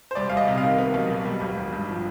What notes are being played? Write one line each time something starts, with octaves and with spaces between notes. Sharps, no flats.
C5
C2 D5
C2 F5
D#5
C3
F5
D#3
B3
B1
B2
G3
G#1
G#1
G2
F3